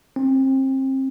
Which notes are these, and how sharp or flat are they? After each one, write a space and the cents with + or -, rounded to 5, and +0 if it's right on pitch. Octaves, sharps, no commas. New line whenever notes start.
C4 +30